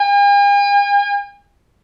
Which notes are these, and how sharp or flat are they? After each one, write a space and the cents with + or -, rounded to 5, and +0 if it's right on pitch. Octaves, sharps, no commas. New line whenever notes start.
G#5 -45